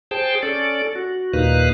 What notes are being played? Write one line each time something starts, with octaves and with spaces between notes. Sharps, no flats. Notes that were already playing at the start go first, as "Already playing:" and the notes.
G#4 C5 G5 A5
C#4 A4 D5
F#4
D#2 A#2 D#4 B4 F5 F#6